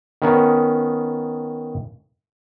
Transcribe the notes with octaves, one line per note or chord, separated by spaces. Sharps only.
D#3 B3 C#4 D#4